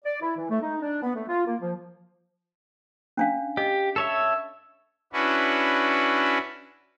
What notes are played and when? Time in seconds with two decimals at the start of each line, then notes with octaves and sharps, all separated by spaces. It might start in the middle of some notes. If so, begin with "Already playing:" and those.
0.05 D5
0.22 E4
0.37 E3
0.50 A3
0.61 D#4
0.81 D4
1.03 B3
1.15 A3
1.27 F4
1.46 A#3
1.60 F3
3.17 C#4 D4 F5
3.57 G4 D#5
3.96 A4 C#5 E5
5.13 C#4 D4 E4 F#4 B4